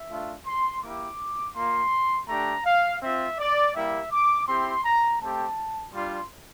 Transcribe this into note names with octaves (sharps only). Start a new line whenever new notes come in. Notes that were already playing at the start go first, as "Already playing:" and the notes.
Already playing: E5
A3 D4 F4
C6
A#3 E4 G4 D6
A#3 F4 C6
A3 D4 G4 A#5
F5
C4 F4 E5
D5
G3 A#3 E4 G4 E5
D6
C4 E4 G4 C6
A#5
A3 C4 G4 A5
G3 D4 F4 C6